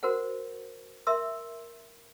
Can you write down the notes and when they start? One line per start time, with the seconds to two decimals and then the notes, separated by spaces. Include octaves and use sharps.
0.03 F#4 A#4 C5 F#5
1.07 A#4 E5 C6 E6